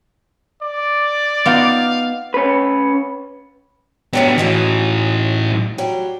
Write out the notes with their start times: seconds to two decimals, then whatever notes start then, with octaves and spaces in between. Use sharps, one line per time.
0.62 D5
1.46 B3 D#4 F4 F5
2.34 C#4 B4
4.13 A2 F#3 G3 B3 D4
4.38 A2 E3 F#3 G#3 D#4
5.78 F#3 G3